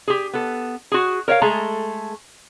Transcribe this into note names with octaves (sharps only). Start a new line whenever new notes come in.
G4 G#4
B3 A4
F#4 G#4
A#4 C#5 E5 F5
G#3 A3 G#4 A4 A#5